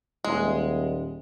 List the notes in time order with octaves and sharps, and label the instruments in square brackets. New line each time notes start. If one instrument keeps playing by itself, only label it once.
[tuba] D#1 [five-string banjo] G#3